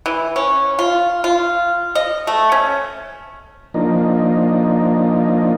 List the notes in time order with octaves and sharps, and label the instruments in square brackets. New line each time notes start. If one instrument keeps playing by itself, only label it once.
[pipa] E3
C#4
F4
F4
D#5
A3
C#4
[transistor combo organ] F3 A#3 D4 D#4